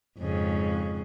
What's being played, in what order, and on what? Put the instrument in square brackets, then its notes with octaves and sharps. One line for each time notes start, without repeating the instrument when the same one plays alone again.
[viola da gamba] F2 G#2 C#3